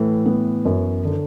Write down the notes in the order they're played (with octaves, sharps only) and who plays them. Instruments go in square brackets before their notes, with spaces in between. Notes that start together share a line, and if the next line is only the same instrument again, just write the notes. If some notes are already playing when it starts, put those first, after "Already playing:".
Already playing: [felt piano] A2 [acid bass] E3
[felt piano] B3
F#2
D3